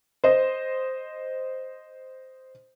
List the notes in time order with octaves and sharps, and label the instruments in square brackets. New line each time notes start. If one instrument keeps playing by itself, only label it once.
[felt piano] C5 D#5